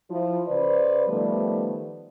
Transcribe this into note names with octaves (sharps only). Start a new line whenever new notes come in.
F3 E4
C#3 B4 C5 D5
D#3 F3 G3 A3 B3 D5